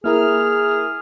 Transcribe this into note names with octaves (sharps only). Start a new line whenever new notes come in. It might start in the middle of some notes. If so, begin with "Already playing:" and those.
A#3 E4 G#4 A#4 F6